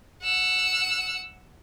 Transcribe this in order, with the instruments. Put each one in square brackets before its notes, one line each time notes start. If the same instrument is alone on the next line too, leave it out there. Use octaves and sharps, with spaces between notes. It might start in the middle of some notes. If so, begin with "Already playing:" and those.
[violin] F#5 E6